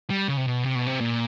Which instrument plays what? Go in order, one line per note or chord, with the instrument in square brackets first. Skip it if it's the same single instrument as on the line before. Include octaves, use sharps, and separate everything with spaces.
[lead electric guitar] G3
C#3
C3
B2
C3
B2
C3
A#2